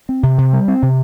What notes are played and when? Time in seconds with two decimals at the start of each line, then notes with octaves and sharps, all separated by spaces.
0.09 C4
0.23 C3
0.38 C3
0.53 G3
0.68 C4
0.82 C3